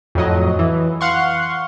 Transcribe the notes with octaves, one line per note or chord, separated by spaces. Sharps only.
F2 A2 F#3 D#5
E3
F5 F#5 C6 C#6